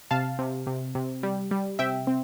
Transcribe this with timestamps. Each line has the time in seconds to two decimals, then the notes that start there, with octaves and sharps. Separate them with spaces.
0.11 C3 F5 A5
0.39 C3
0.67 C3
0.95 C3
1.23 G3
1.51 G3
1.79 C3 E5 G5
2.07 C4